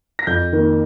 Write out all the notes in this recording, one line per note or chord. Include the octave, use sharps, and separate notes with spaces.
A#6
F2 G6
D#3 A#3